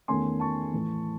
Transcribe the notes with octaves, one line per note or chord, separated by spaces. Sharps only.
E2 D#3 A3 C#4 G#5 C6
A5 C#6
A2 E3 A3